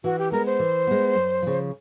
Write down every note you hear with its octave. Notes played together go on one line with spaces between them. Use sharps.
E3 F#4
G4
G#3 B3 A#4
C5
E3
G#3 B3
F#2
C#3 F3